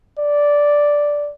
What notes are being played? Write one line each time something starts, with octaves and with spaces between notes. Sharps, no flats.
D5